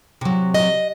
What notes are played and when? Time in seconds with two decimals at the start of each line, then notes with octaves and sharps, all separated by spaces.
0.21 C3 F#3
0.54 D#5